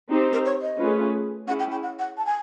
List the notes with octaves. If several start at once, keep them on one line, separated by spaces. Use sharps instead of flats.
C4 D#4 G4 C5
A#4
C#5
D#5
A3 C#4 F4 G#4 B4
C#4 E4 G#4 F#5
G5
G5
F#5
F#5
A5
G#5